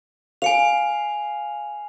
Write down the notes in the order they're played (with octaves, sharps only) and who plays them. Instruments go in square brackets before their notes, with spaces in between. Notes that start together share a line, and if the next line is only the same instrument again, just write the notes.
[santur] F5 [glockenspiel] G#5 C#7 F7